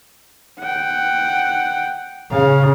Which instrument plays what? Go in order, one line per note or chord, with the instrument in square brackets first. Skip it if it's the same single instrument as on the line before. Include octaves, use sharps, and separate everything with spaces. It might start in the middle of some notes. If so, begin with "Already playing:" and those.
[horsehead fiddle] F#5 G5
[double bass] C#3 [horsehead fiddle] F5